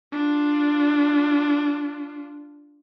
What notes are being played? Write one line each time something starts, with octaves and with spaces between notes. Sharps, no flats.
D4 F4